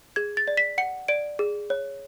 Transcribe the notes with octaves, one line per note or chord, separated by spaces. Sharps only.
G#4 G#6
A6
D5
B6
F#5 C#7
D5 D7
G#4
C#5